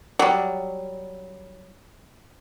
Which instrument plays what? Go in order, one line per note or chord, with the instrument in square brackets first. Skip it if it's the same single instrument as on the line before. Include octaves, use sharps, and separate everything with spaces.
[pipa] F#3 G3